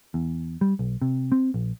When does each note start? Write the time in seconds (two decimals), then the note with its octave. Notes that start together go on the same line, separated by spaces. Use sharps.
0.14 E2
0.61 G3
0.79 B1
1.02 C3
1.32 C4
1.54 A#1